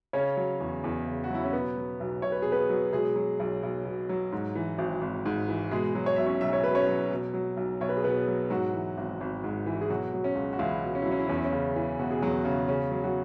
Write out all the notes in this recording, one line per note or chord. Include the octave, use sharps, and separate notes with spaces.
C#3 C#4 C#5
F#3
E2
E2
C#3
F#4
F#3 E4
C#4
B2 B3
F#3
B1
B1 C#5
B4
B2 G#4
B3 B4
F#3
B2 G#3 G#4
F#3
B1
B1
B2
F#3
G#2
E3
G#1
G#1
G#2
E3
B2 G#3 G#4
F#3
C#5
B1 E5
C#4 C#5
B1 E5
C#5
B2 B4
C#4 C#5
F#3
B2
F#3
B1
B1 C#5
B4
G#4
B2 B3 B4
F#3
G#2 F#3 F#4
E3
G#1
G#1
G#2
E3
G#4
B2 F#3 F#4
F#3
C#4
C#2
F#4
C#2 E3 E4
B2
C#4
E4
F#3
C#4
E4
E2 C#4
E4
C#4
C#3
E3
E1 F#4
G#4
E2 F#3 F#4
C#3
C#3 C#4
F#3
F#3 F#4